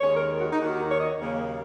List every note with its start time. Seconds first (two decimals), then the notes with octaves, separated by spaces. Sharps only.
0.01 D#2 D#3 G#3 C#5
0.16 A#4
0.40 F#4
0.51 D#4
0.61 D#2 D#3 A#3 F#4
0.91 C#5
1.00 D#5
1.20 D#2 C#3 F#3 A#3